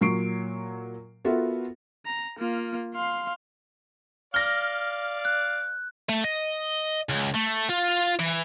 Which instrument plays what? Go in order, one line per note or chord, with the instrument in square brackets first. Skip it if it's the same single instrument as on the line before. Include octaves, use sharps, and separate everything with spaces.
[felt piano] A#2 F#3 C#6 C7 D7
B3 F4 F#4 A4 A#4 E5
[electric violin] A#5
A#3 F4
F5 C6
[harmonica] D5 F5 [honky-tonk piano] F6 A#6 [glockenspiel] G7
[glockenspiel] F#6
[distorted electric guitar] A3
D#5
C#2
A3
F4
E3